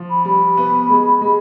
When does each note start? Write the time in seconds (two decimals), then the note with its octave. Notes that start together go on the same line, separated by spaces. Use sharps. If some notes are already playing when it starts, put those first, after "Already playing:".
Already playing: F3
0.10 B5
0.25 G3 B5
0.57 B3
0.90 G#3
1.21 G#3